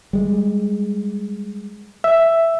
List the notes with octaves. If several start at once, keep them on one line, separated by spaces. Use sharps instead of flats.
G3 G#3
E5 E6